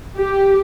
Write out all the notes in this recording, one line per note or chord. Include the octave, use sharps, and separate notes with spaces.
G4